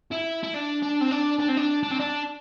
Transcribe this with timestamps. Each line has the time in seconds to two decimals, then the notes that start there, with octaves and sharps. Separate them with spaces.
0.11 E4
0.43 E4
0.54 D4
0.83 D4
1.01 C4
1.12 D4
1.39 D4
1.49 C4
1.57 D4
1.83 D4
1.91 C4
2.00 D4